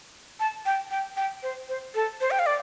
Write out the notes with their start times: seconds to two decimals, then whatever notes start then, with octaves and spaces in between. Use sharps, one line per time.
0.40 A5
0.66 G5
0.91 G5
1.17 G5
1.43 C5
1.69 C5
1.95 A4
2.21 C5
2.31 G5
2.39 F5
2.46 D5